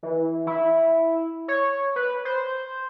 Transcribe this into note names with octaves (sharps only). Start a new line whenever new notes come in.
E3
E4
C#5
B4
C5